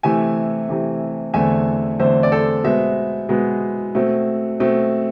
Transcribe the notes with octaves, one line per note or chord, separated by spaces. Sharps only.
C3 E3 A3 E5 G#5
C3 E3 A3
E2 D3 A3 C4 E5 G#5
E2 D3 A3 C4 C5 E5
D5
A4 C5
B2 G#3 B3 C5 E5
B2 G#3 B3
B2 A3 C4
B2 A3 C4